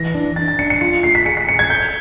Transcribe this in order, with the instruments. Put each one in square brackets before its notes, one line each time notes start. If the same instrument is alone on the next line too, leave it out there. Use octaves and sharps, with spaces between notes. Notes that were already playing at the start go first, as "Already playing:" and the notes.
Already playing: [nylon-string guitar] E3 [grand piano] A#6
[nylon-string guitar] D4
[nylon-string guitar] D4 [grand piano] A6
[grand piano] A6
[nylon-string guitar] D4 [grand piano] C#7
[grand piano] C#7
[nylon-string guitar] F4 [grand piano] C#7
[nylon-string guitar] A3 [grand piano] C7
[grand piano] B6
[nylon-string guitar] G#4 [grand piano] C#7
[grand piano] B6
[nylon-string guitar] C#4 [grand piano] C#7
[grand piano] G#6
[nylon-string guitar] A4 [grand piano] G6